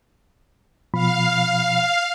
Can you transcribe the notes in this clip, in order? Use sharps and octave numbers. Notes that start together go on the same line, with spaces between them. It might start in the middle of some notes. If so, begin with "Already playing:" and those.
B2 F3 F5 B5